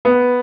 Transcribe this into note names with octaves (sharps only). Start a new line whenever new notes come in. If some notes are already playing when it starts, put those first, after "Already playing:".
B3